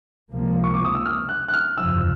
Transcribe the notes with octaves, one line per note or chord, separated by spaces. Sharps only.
C#2 C3 F3 A#3
C#6
D6
D#6
E6
F6
F#6
F#6
F6
F#1 E2 C3 F3 E6